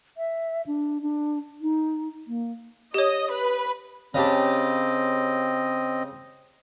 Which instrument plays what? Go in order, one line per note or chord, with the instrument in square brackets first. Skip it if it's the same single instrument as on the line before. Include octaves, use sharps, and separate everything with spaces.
[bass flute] E5
D4
D4
D#4
A#3
[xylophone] G4 C#5 [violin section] D#5
[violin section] B4
[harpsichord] C#3 G4 A5 [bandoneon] C4 D#5